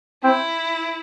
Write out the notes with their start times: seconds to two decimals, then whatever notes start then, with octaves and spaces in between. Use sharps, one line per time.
0.24 C4 E4